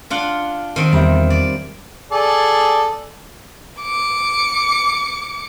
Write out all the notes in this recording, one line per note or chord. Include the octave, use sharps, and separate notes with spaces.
D4 F4 F#5
D#3 C4
E2 G3 E5 A#5
D5
G#4 A4 D5
D6 C#7